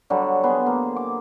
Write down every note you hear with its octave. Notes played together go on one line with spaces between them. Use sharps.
D3 F#3 G3
B3 G#4 C5
A#3
D6